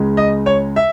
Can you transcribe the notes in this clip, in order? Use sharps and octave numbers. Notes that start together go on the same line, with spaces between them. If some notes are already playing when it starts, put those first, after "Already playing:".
Already playing: C#2 C#3 G#3
D#5
C#5
E5